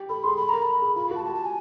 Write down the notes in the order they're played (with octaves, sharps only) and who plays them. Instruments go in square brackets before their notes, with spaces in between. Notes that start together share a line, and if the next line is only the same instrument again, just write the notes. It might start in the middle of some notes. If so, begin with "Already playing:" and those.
Already playing: [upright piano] G4
[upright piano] A4 [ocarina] B5
[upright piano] G#4 [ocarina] C6
[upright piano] A4 [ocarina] B5
[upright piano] A#4 [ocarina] A#5
[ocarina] B5
[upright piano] G#4
[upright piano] F4 [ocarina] B5
[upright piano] F#4 [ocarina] A5
[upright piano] G4 [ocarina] A5
[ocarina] A5
G#5